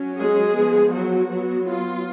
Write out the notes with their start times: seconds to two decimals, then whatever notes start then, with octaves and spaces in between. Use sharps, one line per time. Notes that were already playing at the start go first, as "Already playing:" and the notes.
Already playing: F#3 C#4
0.19 G#3 G#4
0.56 F3 B3
0.93 F#3 F#4
1.30 F#3 B3
1.67 F4